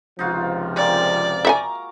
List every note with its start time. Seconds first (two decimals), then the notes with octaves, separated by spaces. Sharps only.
0.19 C#2 C3 F3 D#4 F4 F#4
0.76 G#3 A#3 C4 D5
1.45 E5 F#5 G#5 A#5 C#6 D6